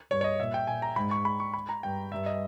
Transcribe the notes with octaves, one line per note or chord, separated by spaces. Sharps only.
G2 C#5
C#5
D#5
A#2 E5
G5
A#2 G#5
A#5
G#2 B5
C#6
B5
C#6
B5
A#5
G2 G5
G2 E5
D#5